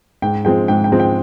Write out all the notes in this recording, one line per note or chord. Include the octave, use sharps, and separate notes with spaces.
G#2 G5
F3 G#3 C4 G5
G#2 G5
G5
F3 G#3 C4
G5